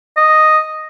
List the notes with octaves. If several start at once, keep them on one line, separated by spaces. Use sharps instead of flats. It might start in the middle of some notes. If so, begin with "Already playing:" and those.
D#5